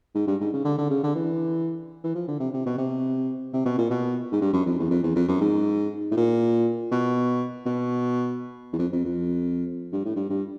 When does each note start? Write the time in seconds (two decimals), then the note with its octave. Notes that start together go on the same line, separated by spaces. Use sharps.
0.15 G#2
0.27 G2
0.41 G#2
0.53 C#3
0.65 D3
0.78 D3
0.90 C#3
1.03 D3
1.15 E3
2.04 E3
2.15 F3
2.28 D3
2.40 C3
2.54 C3
2.66 B2
2.78 C3
3.53 C3
3.65 B2
3.78 A#2
3.90 B2
4.32 G#2
4.41 G2
4.53 F#2
4.66 F2
4.79 E2
4.91 F2
5.03 E2
5.15 F2
5.28 F#2
5.41 G#2
6.11 A2
6.17 A#2
6.92 B2
7.66 B2
8.73 E2
8.78 F2
8.92 F2
9.05 F2
9.92 G2
10.05 A2
10.16 G2
10.29 G2